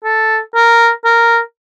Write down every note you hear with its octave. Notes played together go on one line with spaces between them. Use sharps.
A4
A#4
A#4